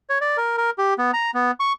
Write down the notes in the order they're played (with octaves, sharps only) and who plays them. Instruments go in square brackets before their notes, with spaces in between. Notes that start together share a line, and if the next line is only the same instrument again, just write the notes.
[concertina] C#5
D5
A#4
A#4
G4
B3
A#5
B3
C#6